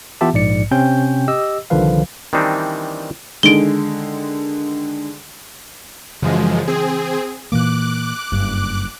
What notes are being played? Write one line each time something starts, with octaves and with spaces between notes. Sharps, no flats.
E3 B3 F4 G4 E5 A5
A#1 G#2 D5 C#7
C3 C4 C#4 G5 G6
G4 D#5 E6
C2 D3 D#3 F3 B4 F5
D#3 E3 G3 C4 D4 D#4
D3 D#3 G#3 D7 G7
F#2 C#3 E3 F3 G#3
C4 G#4
A#2 E3 A#3 D6 F#6
F#1 G2